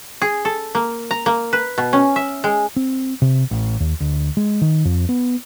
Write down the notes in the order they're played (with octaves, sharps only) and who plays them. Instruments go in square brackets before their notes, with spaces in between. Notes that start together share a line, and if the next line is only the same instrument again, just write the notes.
[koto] G#4
A4
A#3
A#5
A#3
B4
B2
C#4
E5
G#3
[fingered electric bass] C4
C3
A1
D#2
D2
G#3
D#3
F2
B3